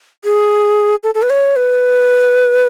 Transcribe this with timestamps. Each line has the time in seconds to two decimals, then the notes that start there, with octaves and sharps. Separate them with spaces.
0.25 G#4
1.03 A4
1.15 A4
1.22 B4
1.30 C#5
1.56 B4